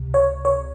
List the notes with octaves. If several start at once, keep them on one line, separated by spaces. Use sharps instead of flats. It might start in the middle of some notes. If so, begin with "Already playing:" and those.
Already playing: C#2 C3
C#5
C#5